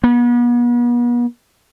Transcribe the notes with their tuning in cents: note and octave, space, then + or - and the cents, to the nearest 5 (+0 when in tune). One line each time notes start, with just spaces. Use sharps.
B3 -40